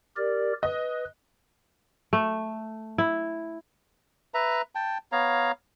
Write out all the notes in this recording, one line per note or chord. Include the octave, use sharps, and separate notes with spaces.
G4 A#4 D5
B4 D#5
A3
E4
B4 E5 A#5
G5 A5
B3 C#5 F5 A#5